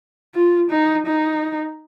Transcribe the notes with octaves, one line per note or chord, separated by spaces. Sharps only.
F4
D#4
D#4